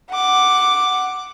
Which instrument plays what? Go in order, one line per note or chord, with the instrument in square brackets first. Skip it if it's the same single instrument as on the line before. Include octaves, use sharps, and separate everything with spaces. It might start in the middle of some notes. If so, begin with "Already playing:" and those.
[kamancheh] F#5 D6